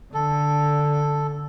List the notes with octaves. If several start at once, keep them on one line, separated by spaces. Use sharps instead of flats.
D3 A4